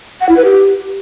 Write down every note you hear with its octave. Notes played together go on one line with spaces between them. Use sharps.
F#5
E4
B4
G4